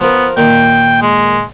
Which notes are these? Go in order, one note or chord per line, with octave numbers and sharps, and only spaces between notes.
F3 B3 A#4
A#2 D#3 G5
G#3